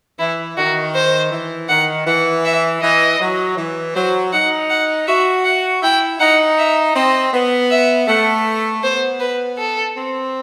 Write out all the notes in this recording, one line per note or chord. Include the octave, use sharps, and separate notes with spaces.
E3 E4
D#3 F#4
C5
E3
D#3 F#5
E3 F#5
E5
E3 D#5
F#3
E3
F#3 C5
D#4 F#5
F#5
F#4 E5
F#5
E4 G5
D#4 F#5
E5
C4 D#5
B3
E5
A3 F#5
B3 C5
B4
A4
C4